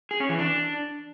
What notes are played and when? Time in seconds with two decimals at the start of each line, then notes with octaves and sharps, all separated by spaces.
0.11 G#4
0.20 C#4
0.29 E3
0.39 D4